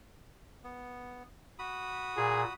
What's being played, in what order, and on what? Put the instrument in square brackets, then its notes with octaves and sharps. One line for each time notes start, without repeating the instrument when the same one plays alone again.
[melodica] B3
F#4 B5 D#6
[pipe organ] A#2 [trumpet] G#4